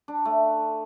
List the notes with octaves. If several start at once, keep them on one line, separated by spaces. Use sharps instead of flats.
D4
A3